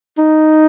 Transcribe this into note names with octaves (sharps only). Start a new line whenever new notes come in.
D#4